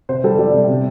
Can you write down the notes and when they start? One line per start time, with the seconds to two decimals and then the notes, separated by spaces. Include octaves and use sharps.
0.09 C3 C5
0.24 G3 A4
0.39 G3 D5
0.54 C3
0.68 C3